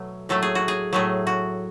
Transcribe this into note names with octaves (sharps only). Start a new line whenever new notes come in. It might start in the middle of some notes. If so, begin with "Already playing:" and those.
Already playing: B2 F#3 A3
A2 F#3 A3 A4
G#4
F#4
G#4
A2 F#3 A3 G#4
F#4